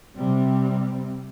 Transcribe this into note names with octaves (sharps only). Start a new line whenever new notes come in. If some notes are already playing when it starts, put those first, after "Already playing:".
C3 G3 C4